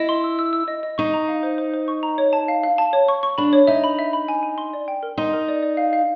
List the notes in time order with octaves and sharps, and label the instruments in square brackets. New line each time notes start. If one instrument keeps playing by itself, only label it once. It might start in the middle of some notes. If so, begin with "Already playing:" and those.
Already playing: [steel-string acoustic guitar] E4 [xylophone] D#5
[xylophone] C6
E6
E6
E6
D#5
D#5
[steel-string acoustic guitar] D#4 [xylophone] C#6
[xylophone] A#5
F5
C5
C5
C5
C#6
A#5
C#5
A5
F5
F5
A5
C#5
C#6
C#6
[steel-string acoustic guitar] D4 [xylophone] B5
[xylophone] C#5
[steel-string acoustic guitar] D#4 [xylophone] E5
[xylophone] B5
E5
B5
G#5
G#5
C6
D5
G5
A#4
[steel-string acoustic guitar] D#4 [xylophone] C6
[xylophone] A#4
D5
D5
F5
F5